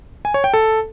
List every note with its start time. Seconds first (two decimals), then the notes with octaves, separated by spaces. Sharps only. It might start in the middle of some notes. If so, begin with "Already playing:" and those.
0.25 G#5
0.34 C#5
0.44 G5
0.54 A4